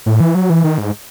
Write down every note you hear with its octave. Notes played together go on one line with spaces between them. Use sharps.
A2
E3
F#3
E3
D#3
G#2